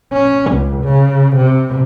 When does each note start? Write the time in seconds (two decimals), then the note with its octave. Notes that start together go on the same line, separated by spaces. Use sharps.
0.13 C#4
0.51 C#2
0.84 C#3
1.36 C3